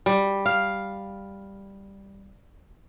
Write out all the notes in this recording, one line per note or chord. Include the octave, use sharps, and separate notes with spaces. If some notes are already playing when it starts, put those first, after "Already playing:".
G3
F5